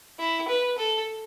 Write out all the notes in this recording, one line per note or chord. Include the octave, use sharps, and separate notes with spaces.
E4
B4
A4